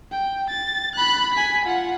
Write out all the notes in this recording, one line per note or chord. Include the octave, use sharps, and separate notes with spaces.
G5
A6
B5 F#6
G#5 B6
F4 F#5